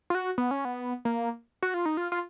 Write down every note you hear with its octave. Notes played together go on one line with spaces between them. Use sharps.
F4
F#4
B3
C#4
B3
A#3
F#4
F4
D#4
F4
F4